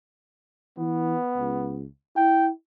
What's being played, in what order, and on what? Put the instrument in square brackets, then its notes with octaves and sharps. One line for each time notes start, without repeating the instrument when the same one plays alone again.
[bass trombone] E3 [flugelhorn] B3
[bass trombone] C#2
[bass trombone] E4 [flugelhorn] G5